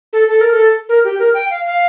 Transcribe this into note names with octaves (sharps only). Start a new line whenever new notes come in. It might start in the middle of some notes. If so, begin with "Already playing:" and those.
A4
A4
A#4
A4
A#4
G4
A#4
G5
F5
F5